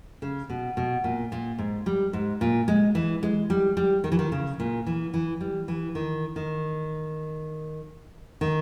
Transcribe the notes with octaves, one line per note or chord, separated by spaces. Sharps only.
C#3
B2
B2
A#2
A#2
G#2
G3
G#2
A#2
G#3
E3
G#3
G3
G3
D#3
E3
D#3
C#3
A#2
E3
E3
G3
E3
D#3
D#3
D#3